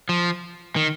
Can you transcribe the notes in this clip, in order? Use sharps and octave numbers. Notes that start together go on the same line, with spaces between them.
F3
D#3